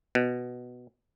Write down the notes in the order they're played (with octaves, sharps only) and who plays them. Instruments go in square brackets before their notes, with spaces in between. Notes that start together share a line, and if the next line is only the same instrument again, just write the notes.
[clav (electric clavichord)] B2